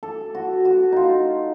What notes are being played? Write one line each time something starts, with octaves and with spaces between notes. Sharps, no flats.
A4
F#4
F#4
D#4 F4